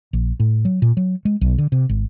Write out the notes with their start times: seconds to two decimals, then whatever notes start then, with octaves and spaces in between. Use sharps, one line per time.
0.13 A#1
0.40 A2
0.65 F#3
0.82 A#2
0.97 F#3
1.25 G#3
1.41 B1
1.58 D3
1.72 C3
1.89 G#1